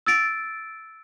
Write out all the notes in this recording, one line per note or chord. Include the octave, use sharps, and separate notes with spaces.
E6 A6 D7